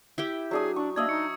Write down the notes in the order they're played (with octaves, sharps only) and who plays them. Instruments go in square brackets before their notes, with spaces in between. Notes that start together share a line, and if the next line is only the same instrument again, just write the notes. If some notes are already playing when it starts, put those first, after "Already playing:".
[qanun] E4 G4 G5 [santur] E5
[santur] F#3 D4 D#6 [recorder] G#4
[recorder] D4 [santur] C#6
[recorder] A#3 [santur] D4 D#5 E5 [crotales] D#6 E6 G#6
[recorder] D#4 [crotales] C#6 E6 C#7